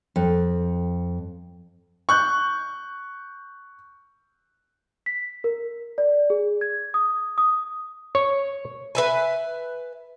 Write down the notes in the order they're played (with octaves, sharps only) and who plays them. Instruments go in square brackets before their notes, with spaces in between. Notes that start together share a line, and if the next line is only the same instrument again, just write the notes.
[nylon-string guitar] F2
[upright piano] C#6 F#6 G6
[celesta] B6
A#4
D5
G#4
G#6
D#6
D#6
[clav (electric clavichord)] C#5
[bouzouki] B4 E5 G#5